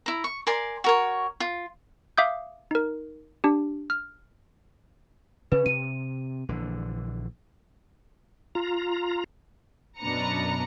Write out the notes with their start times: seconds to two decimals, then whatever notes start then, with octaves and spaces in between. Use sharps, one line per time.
0.06 E4 A#5
0.24 C#6
0.47 A#4 D5 G#5 C6
0.84 F#4 A#4 C#5
1.40 F4
2.18 E5 F5 D6 D#6 G6
2.71 D#4 A#4
3.44 D4 G4
3.90 F6
5.52 C#3 C#4 B4
5.66 C3 D#7
6.49 A#1 D3 E3
8.55 F4 A#5
10.00 F#2 B2 D4 B4 A#5 C#7